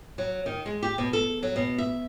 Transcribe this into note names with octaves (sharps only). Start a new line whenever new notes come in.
F#3
D#3
G#3
G4
B2
A4
F#3
B2
E5